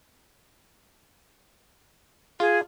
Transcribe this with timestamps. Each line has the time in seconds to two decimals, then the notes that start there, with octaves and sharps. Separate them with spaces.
2.40 F4 G#4